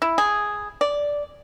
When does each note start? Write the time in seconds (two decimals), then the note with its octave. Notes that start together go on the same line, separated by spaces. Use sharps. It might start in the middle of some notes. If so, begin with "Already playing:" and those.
0.02 E4
0.18 G#4
0.81 D5